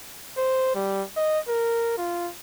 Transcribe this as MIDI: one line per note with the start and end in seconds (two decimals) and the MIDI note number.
0.38 0.74 72
0.75 1.03 55
1.17 1.39 75
1.49 1.94 70
1.98 2.29 65